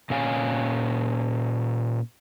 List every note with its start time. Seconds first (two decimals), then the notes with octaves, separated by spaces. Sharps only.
0.10 A#2 C#4 F5 G#5